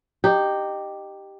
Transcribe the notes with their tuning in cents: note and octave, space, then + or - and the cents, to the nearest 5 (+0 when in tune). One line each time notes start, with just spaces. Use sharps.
D#4 -20 G4 +0